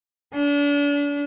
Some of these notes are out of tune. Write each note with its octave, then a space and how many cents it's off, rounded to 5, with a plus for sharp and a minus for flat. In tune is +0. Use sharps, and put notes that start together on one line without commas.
D4 -35